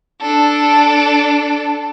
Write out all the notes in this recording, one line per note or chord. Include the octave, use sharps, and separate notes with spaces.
D4 A4